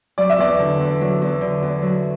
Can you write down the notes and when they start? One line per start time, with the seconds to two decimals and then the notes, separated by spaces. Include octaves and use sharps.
0.18 F#3 D5
0.30 E5
0.38 E2 D5
0.59 D3
0.80 E2
1.01 F#3
1.22 E2
1.41 D3
1.63 E2
1.82 F#3